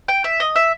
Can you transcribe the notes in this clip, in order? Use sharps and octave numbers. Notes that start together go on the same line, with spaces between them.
G5
E5
D#5
E5